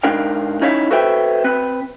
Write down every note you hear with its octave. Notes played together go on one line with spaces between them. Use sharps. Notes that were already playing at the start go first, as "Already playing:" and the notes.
G#2 D4 D#4 A#4 F5 G5
C#4 D#4 E4 C#5 E5 F5
F#4 A4 B4 C5 E5 G5
C4 B4